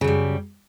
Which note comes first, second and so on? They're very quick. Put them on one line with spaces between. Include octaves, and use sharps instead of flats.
C#3 F#2 G3